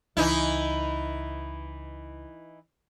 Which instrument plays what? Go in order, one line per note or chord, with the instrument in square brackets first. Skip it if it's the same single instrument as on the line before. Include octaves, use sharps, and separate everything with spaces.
[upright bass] C#2 [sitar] E3 D#4 E4